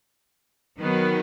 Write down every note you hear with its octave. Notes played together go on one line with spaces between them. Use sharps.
D#3 F#3 B3